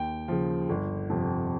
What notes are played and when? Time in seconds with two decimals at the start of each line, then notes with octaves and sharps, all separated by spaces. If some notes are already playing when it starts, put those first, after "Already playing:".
Already playing: D#2 G5
0.28 C#3 F3
0.69 G1
1.10 F2 C3 F3